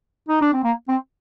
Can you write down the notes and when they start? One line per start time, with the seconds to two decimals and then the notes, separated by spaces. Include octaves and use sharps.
0.29 D#4
0.41 D4
0.53 C4
0.64 A#3
0.88 C4